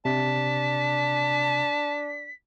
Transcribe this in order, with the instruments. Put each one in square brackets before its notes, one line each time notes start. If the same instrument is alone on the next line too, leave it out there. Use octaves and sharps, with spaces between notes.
[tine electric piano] C3 [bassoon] D4 [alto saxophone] A5 [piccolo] B6